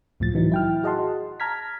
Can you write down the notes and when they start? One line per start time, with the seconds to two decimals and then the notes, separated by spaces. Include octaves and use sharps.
0.20 C#2 A2 F3 A6
0.34 A2 E3 F#3 D#4
0.52 E4 G5 F6
0.83 F#4 G#4 D#5 F#5 A5 C6
1.40 A5 A#5 F6 G#6 B6